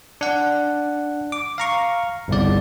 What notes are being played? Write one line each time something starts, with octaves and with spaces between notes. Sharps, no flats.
D4 F#5
D6
F5 A#5 C#6
G1 C2 D5